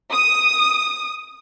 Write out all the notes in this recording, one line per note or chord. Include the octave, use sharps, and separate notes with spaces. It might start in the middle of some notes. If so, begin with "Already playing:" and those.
D#6